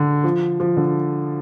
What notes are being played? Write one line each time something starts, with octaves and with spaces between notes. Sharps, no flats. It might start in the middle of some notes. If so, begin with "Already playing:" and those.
Already playing: D3
F3
F3
D3